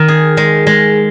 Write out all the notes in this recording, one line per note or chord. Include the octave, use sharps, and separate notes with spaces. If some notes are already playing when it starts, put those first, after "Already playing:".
Already playing: D#3
G#4
G#3
G#3